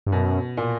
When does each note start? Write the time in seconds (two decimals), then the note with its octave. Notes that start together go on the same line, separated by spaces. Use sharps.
0.07 G2
0.12 F#2 B2
0.57 A#2